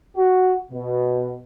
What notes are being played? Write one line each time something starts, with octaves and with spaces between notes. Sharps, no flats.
F#4
B2